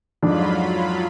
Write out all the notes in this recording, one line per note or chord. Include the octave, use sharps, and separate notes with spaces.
F2 G#2 F#3 D4 F4 B5